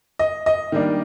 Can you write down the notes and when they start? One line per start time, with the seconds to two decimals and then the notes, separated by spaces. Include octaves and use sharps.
0.19 D#5
0.46 D#5
0.72 D#3 G3 A#3 D4